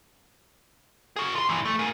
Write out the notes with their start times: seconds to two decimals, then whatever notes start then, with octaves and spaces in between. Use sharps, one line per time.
1.16 F#4 G#4
1.35 F4 C6
1.49 G2 E3
1.65 A3
1.79 A#3 G#4